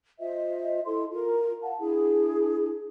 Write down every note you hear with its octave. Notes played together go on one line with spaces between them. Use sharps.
F4 C5 D#5 E5
E4 A4 C6
F4 A#4
F5 F#5 A5
D4 E4 G#4